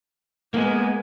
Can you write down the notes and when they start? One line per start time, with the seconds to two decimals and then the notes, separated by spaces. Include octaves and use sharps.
0.54 G#3 A#3 B3